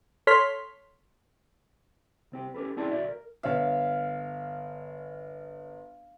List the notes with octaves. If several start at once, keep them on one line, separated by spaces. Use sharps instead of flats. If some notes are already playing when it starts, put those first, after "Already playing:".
A4 C#5 C6 F6 B6
C2 C4 G4
C#4 G4 A4 B4
C4 C#4 E4 G#4 D5 A5
B1 F#4 D5 E5
A#4
G1 C#5 E5 F5